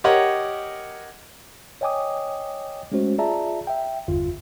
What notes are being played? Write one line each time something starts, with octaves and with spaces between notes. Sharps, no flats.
G4 A#4 C#5 D#5 F#5
C#5 D#5 G5 G#5 D6 D#6
G#3 A3 C#4 F#4 C5
F4 G#4 D5 E5 A5 A#5
E5 G5
G1 E2 F4